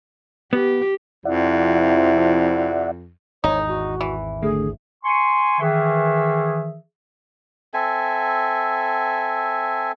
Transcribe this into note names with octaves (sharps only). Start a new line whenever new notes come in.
B3 G4
F2 C3 F3 E4 D5 E5 F#5
G#1 E2 D#4 C#5
F#4
E3
D3 A3 G#4
G#5 C6 C#6
D#3 E3 G#4 E5
C4 A4 E5 G#5